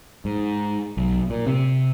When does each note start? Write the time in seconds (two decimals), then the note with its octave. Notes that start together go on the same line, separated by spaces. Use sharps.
0.25 G#2
0.97 B1
1.30 A#2
1.47 C3